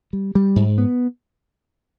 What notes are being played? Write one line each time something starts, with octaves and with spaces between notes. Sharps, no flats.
G3
G3
G#2
B3